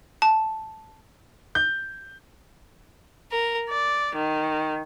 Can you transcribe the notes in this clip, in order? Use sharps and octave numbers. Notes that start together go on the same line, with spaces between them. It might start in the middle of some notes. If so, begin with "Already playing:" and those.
A5
G6
A#4
D5
D#3